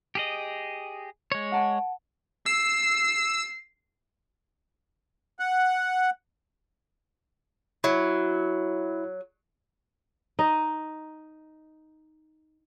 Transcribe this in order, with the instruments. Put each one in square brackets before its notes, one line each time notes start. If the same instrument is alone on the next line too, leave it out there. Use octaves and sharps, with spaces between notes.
[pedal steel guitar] G4 G#4 D#5
G#3 C#5
[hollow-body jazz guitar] F#5 A5
[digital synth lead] E6 [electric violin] C7
[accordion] F#5
[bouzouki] F#3 [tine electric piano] E4
[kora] D#4 D#5